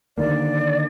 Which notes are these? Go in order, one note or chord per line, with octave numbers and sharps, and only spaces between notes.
D3 D#3 A#3 D5